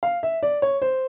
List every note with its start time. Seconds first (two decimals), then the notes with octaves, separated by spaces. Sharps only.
0.03 F5
0.23 E5
0.43 D5
0.62 C#5
0.82 C5